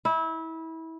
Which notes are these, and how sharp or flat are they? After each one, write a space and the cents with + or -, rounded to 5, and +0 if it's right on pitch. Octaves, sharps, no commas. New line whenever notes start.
E4 -25